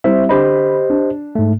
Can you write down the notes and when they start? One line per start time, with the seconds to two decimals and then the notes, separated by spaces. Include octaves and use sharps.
0.04 G3 C4 E4 C5 E5
0.29 D3 G4 C5 D#5 B5
0.90 D4
1.35 G#2 A3